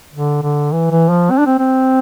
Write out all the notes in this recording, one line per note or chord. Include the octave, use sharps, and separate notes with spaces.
D3
D3
E3
E3
F3
C4
D4
C4
C4